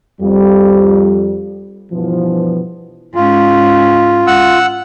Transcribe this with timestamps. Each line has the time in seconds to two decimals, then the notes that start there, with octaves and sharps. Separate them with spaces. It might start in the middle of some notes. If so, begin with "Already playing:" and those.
0.21 F2 G3
1.92 G2 B2 E3 F3
3.15 G#2 C#4 F4
4.27 F#5 E6